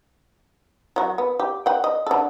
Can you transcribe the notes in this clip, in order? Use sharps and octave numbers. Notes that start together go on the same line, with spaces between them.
F#3 F#4
B3
G4
F#5 G5
D#5
D3 A4